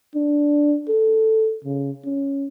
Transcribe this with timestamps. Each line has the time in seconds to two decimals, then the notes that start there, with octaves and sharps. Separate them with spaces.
0.15 D4
0.88 A4
1.64 C#3
2.05 C#4